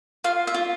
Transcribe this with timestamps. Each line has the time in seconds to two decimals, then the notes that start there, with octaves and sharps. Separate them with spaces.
0.24 F4 F5
0.47 E5
0.54 F4